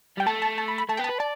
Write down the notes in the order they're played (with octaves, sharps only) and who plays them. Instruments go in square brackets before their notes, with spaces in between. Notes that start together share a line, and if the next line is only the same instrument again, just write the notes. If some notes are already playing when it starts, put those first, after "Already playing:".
[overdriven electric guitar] G3 [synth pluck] G5
[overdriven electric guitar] A3 [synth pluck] A5
[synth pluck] A5
A5
B5
B5
[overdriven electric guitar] A3 [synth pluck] A5
[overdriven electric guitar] B3 [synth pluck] G5
[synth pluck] A5
[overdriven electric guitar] B4
[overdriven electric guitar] D5 [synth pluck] A5